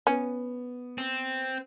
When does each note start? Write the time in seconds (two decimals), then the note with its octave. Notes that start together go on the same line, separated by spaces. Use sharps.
0.07 B3 C#4
0.98 C4